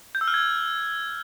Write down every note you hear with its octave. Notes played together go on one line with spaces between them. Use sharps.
G6
E6
F6
G#6